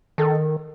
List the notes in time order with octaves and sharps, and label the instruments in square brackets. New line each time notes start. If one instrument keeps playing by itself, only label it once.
[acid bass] D#3 [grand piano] A4